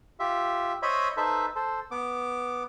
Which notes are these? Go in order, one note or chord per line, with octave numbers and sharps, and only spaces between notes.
F4 G4 E5
C5 C#5 D#5 E5 B5
D#4 A4 B4 C5 E5
A4 C5
B3 D6